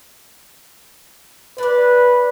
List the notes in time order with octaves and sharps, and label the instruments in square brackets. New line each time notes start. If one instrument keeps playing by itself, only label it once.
[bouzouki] D4 D5 [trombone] B4